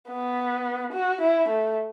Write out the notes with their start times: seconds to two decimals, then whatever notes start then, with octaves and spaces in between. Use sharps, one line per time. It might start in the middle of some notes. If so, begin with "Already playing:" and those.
0.08 B3
0.93 F#4
1.21 E4
1.49 A3